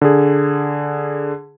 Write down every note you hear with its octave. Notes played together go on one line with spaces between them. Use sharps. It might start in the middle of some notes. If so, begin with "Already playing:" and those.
D3 G#4